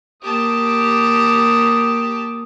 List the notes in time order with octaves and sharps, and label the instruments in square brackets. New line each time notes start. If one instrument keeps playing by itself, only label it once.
[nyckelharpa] A#3 D#6 [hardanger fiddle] G4 A5